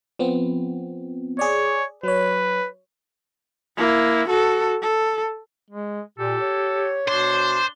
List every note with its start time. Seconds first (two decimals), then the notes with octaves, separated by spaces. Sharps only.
0.19 F3 B3 C4
1.39 G#4 C#5 D5
2.03 F#3 B4 C#5
3.78 A#3 E4
4.28 F#4 A4
4.82 A4
5.70 G#3
6.19 A#2 G4 A4
6.41 C#5
7.08 B2 D4 C5